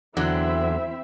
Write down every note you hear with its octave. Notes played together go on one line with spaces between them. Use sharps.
E2 D3 F#3 C4 E4 E5